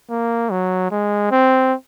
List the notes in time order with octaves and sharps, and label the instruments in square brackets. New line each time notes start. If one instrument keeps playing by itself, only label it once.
[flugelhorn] A#3
F#3
G#3
C4